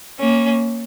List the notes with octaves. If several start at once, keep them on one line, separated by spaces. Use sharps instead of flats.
A#3 C#4